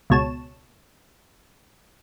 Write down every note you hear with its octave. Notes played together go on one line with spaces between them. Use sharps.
C#2 B2 C#5 A5 E7